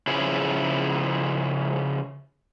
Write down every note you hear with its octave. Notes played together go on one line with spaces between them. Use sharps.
C#3 F3 E4 G#4